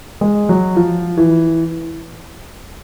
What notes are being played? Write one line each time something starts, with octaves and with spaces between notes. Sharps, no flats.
G#3
F#3
F3
E3